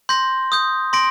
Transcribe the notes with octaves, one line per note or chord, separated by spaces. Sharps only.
C6 G6 A#6
D#6 G6
C6 A#6 D7